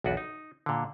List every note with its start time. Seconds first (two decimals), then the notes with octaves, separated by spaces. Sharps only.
0.04 B1 E2 D4 F#4 B4
0.17 D#4
0.66 A#2 D3